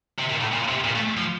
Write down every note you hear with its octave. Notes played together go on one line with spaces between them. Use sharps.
C3
A#2
A2
A#2
C3
A#2
A3
F3